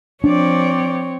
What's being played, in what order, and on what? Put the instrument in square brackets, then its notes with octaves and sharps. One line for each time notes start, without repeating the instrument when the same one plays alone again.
[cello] F3 D5 [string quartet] C4 C#5 [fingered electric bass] D4